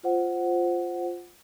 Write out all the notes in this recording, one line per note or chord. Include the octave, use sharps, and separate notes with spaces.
F4 C5 F#5